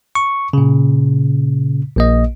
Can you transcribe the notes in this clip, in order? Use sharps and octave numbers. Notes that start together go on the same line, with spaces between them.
C#6
A#2 C#3
A#1 A#3 D#5